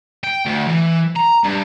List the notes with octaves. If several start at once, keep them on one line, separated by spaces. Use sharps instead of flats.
G5
D2
E3
A#5
G2